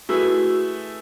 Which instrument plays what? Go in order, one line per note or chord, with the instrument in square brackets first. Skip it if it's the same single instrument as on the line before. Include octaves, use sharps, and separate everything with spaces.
[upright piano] A3 E4 G#4 B4 [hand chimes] F#4